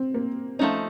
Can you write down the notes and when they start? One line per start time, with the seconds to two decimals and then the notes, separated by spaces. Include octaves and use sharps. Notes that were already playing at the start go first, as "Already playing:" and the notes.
Already playing: C4
0.14 A#3
0.59 F3 A3 C#4 D#4